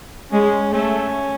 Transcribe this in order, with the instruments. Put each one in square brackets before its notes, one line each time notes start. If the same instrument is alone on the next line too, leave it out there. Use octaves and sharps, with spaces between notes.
[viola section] G#3 [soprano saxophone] C#4
[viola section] A3 [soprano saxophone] C#4